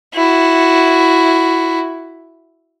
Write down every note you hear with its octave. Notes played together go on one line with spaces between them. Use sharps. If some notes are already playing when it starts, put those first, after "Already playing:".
E4 F#4